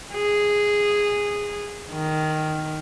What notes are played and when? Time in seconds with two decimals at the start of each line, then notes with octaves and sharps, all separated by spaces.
0.13 G#4
1.91 D#3